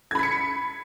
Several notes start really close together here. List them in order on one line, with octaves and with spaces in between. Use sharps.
G#6 B5 B6 C#7